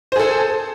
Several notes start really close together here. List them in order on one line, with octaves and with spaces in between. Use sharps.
C5 G#4 A4